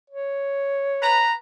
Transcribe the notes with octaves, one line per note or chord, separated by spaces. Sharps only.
C#5
B4 A#5